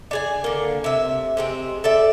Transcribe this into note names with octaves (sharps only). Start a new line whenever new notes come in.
D4 G#4 G#5
D3 A#3
C3 E5
C3 G#3 C4
A4 D5 E5